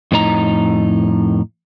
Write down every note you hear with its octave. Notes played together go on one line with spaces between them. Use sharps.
F2 A2 D#4 A#5